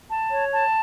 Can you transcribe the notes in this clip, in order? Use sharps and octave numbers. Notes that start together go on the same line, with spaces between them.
A5
C#5
A5